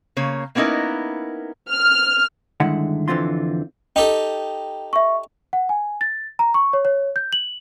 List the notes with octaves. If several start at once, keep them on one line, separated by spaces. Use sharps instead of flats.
C#3 A#3 C#5
A#3 B3 C#4 D#4 E4 A#4
F6
G2 D3 D#3 G#3 E4 F#5
F2 D3 E3 C4 F4 C6
D#4 G4 A4 G5
E5 C#6
F#5
G#5
A6
A#5
C#6
C#5
C#5
G6
F#7